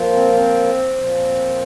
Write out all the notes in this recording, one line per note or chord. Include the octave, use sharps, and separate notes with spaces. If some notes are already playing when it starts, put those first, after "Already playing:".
Already playing: A#2 F3
C4
C4
A#2 F3